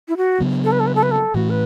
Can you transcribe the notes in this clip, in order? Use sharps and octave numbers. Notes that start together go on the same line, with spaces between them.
E4
F#4
C#3 F#3 B3
A4
B4
A4
B4
A4
B4
A4
A2 E3 A3 F#4
B4